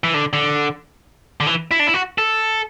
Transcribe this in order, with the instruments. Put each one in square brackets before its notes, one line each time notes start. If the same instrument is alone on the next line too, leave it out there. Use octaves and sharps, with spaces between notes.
[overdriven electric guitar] E3
D3
D3
D3
E3
E4
D4
E4
F#4
A4